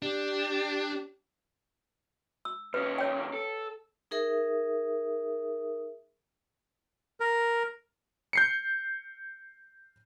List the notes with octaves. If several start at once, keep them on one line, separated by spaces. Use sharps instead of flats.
D4 G4
E6
D#2 C#4 B4
C#5 G5
A4
D#4 G#4 A#4 E5 D#6
A#4
G6 C7 C#7